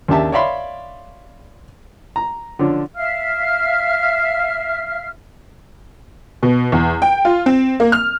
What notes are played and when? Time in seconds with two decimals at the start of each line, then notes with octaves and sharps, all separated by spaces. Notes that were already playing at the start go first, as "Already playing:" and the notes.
0.08 D#2 C#3 D4 G4 E5 A5
0.32 C#5 D5 E5 F5 B5 C6
2.16 A#5
2.59 D3 F3 C#4 D4
2.97 E5 F5 F6
6.43 B2
6.72 E2
7.02 G5
7.25 F4
7.46 C4
7.80 A#3
7.92 F6